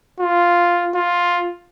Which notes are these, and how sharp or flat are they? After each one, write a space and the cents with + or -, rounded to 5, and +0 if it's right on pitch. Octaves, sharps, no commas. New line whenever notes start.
F4 +0
F4 +10